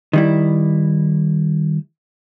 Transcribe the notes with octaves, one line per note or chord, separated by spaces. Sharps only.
D#3 G3 E4